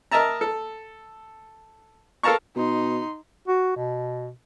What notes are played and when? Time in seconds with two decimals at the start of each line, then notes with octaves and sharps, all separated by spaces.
0.11 A#4 D#5 E5 A5 A#5
0.41 A4
2.23 A4 A#4 F5 A5 A#5 C#6
2.56 B2 D#4 C6
3.48 F#4
3.76 B2